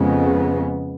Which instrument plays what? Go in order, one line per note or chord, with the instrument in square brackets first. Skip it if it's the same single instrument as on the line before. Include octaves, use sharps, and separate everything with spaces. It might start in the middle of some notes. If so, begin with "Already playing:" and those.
Already playing: [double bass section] F2 C#3 G#3 B3